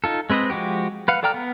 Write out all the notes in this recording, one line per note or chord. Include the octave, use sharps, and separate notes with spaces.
D#4 F4 A4
G#3 C4 B4 C5 D#5
F3 G#3 F#4 G4
B4 F5 F#5
A4 D5 G5 A#5 F6
B3